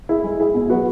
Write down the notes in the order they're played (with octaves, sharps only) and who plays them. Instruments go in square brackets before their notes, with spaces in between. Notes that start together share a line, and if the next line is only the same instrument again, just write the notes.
[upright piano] E4 G#4
G#3
E4 G#4
B2
F#3 B3 F#4 B4